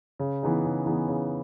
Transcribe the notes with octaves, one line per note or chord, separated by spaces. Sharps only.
C#3
E3 B3 D#4 G#4
C#3
E3 B3 D#4 G#4
C#3